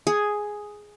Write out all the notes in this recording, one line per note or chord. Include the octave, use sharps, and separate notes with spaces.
G#4